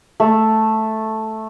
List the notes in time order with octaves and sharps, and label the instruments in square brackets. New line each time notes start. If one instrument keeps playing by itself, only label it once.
[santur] A3